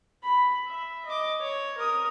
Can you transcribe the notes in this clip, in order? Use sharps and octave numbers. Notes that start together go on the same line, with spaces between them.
B5
E5
D#5 D6
C#5
A#4 D#6